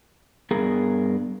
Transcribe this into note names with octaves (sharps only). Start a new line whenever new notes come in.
G2 B3 G#4 A#4